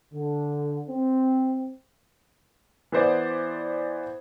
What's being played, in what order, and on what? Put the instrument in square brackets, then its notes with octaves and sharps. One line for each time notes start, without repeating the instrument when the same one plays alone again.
[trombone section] D3
C4
[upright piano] E3 B3 C5 D5